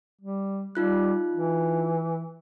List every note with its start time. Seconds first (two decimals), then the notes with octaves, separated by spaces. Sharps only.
0.21 G3
0.75 G3 D#4 F4 F#6
1.36 E3